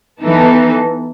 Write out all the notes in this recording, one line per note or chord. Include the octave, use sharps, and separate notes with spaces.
E3 B3 D#4 A4